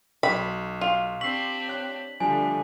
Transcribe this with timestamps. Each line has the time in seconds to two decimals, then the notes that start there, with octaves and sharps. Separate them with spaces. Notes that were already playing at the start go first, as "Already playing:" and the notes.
0.23 B1 B5
0.81 F4
1.21 C4 D4 G4 C#6 E6 B6 C7 F#7
1.68 C#5 F#6
2.20 D3 F3 G3 A3 D4 G#5